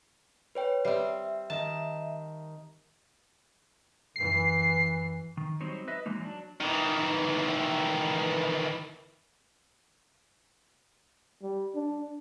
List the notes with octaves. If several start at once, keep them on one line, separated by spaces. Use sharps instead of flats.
B4 C#5 G5
G3 C4 E5 C7
D#3 D#5 A5
F#2 E3 C7
D#3
F#3 G3 C4 D#4 C5 C#5
B4 D#5 E5
E3 F#3 G#3 A#3 D#4
F#3 D4
D#3 E3
G3
D4